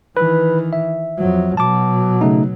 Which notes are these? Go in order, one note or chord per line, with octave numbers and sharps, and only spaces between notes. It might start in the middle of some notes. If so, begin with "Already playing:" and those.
D#3 E3 B4
E5
F2 F#3
B2 F#3 A5 D6
C#3 A3 D#4